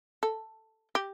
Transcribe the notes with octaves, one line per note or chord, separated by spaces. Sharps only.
A4
G4